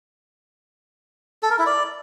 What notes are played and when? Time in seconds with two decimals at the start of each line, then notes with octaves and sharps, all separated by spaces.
1.43 A4
1.51 A#4
1.59 E4
1.67 D5